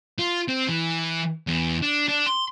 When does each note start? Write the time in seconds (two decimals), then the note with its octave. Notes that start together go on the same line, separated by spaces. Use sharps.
0.19 F4
0.49 C4
0.69 E3
1.47 E2
1.82 D4
2.08 D4
2.26 C6